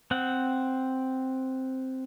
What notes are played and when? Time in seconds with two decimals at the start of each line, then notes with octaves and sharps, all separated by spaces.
0.11 C4 F#5